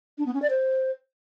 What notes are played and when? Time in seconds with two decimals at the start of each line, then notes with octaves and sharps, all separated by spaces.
0.18 D4
0.26 B3
0.34 C#4
0.42 D5
0.50 C5